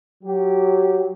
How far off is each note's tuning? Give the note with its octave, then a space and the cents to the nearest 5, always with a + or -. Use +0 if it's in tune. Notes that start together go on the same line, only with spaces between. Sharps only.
F#3 +0 G4 -15